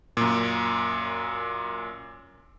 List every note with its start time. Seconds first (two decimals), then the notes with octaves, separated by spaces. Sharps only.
0.17 F#2 A#2